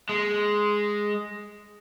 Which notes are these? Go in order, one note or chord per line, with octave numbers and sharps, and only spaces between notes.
G#3